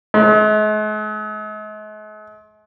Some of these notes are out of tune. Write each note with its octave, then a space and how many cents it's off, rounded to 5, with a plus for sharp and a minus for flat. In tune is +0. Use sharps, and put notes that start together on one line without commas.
G#3 +45